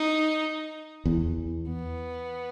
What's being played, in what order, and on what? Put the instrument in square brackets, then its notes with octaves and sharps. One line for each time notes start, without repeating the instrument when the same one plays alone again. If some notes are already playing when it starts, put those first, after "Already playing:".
Already playing: [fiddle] D#4
[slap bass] E2
[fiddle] B3